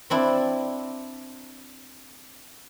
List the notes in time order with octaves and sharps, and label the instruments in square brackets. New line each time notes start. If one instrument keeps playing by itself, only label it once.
[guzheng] C4 D4 E4